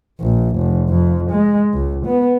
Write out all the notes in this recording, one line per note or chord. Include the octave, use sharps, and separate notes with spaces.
A#1
F1
F2
G#3
C#2
B3